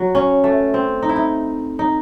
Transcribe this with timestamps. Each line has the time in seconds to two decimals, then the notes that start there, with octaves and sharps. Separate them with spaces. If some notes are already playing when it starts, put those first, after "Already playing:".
Already playing: F#3
0.15 C#4
0.44 A3
0.74 C4
1.02 D#4
1.09 E4
1.16 D#4
1.79 D#4